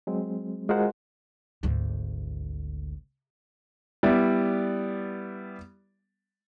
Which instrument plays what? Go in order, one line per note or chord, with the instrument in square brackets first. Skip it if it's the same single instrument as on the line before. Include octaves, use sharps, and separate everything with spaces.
[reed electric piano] F#3 G#3 C4
G#3 F4 F#4 A#4 C5 F#5
[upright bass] G#1 D2
[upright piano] G3 B3 E4 D5